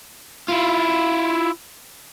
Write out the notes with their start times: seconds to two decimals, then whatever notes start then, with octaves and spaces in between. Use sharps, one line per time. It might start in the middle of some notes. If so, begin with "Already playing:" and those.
0.48 E4 F4